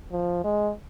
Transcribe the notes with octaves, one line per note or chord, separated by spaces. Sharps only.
F3
G#3